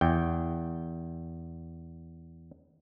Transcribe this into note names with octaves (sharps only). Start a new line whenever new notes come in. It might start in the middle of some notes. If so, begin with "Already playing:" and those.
E2 G5